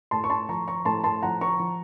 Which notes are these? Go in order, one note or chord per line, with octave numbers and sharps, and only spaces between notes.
A2 A5 C6
C#6
A5 C6
F3 A#5 C#6
A#5 C#6
A2 A5 C6
A5 C6
F3 F#5 A#5
A#5 C#6
F3